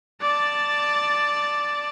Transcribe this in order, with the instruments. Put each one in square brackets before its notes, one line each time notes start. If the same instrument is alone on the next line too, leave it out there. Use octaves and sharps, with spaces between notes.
[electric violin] D5 A5